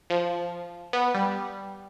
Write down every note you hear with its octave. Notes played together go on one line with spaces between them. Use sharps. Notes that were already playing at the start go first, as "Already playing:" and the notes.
F3
B3
G3